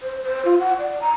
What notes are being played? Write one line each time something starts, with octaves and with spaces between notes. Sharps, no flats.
C5
C5
F4
F#5
D5
A#5